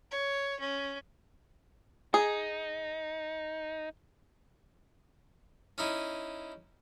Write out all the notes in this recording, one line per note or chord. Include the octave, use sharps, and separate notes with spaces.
C#5
C#4
D#4 G#4
C#4 D#4 E4